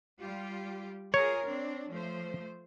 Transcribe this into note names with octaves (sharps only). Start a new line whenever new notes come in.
G3 F4 G4
F4 G#4 A#4 C#5
C4 D4
F3 A3 C5